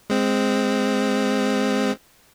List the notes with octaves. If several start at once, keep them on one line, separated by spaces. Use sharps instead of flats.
G#3 C4